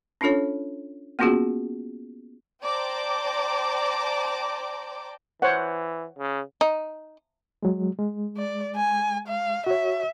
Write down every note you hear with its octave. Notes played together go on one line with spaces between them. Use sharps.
C#4 D4 F4 A4 C#5
A#3 B3 C#4 F4 F#4 G#4
C5 D5 G5 A5 A#5 D6
E3 C5 C#5 F#5
C#3
D#4
F#3 G#3
G#3
D5
G#5
F5
F#4 C#5 E5